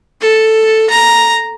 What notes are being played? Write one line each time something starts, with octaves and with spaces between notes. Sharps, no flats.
A4
A#5